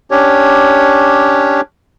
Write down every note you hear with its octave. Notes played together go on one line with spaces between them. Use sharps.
C#4 D4 G4 C#5